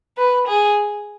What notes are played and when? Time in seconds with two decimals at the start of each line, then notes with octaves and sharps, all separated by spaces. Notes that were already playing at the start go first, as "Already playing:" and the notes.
0.18 B4
0.48 G#4